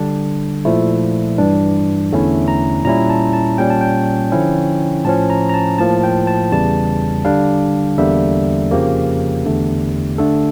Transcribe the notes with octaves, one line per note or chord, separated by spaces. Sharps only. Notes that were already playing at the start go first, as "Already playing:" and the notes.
Already playing: D3 G3 D4 D5
A#2 F3 A3 E4
G2 E3 G3 D4
E2 D3 A3 C#4 E4
A#5
A#2 G3 C#4 E4 A#5
A5
A5
A#2 G3 C#4 G5
A5
G5
D3 F3 C#4 E4
A2 F3 C#4 A5
A#5
A#5
A5
A2 F3 A#3 A5
G5
A5
E2 C#3 E3 G3 A5
D3 G3 D4 F5
E2 D3 G3 A#3 E5
F2 C#3 F3 A#3 G4
E2 D3 A3
D3 A3 D4 A4